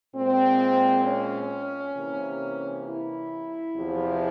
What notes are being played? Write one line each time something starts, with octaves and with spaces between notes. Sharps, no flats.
A#2 G#3 C4
C#4
C3 E3 A#3
E4
E2 C3 F3